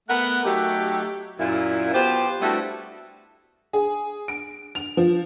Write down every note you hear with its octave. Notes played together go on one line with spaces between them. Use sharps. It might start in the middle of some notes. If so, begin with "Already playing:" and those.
A3 B3 A#4 F#5
F#3 A3 D#4 G4
F#2 A#2 E4
B2 B3 F4 G4 C5
G3 A3 B3 D4 E4 F#4
G#4
D7
F7
F3